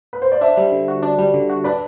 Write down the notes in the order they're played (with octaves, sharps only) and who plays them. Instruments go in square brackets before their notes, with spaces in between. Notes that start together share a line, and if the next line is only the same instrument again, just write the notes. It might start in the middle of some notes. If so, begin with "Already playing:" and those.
[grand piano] B4
C5
D5
[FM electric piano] D4 [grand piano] C5 E5
[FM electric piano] G3
D3
F#4
D4
G3
D3
F#4
[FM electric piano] D4 [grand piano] B4 D5